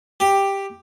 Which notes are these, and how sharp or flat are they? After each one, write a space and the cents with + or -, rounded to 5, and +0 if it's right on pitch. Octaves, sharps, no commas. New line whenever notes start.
G4 +5